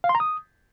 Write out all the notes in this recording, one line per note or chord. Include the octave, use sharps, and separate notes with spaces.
F5
C6
A#5
D#6